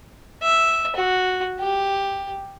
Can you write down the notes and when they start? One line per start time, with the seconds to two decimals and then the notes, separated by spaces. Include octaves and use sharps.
0.42 E5
0.96 F#4
1.60 G4